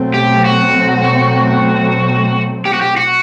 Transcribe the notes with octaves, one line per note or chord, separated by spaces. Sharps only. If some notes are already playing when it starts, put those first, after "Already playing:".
Already playing: B2 F#3 A3 C4
G4
F#4
G4
F#4
G4
F#4